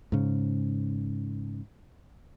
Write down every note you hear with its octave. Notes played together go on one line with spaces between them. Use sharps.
G#2 C#3